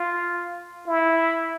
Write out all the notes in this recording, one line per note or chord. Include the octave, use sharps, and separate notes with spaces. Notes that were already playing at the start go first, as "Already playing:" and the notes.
Already playing: F4
E4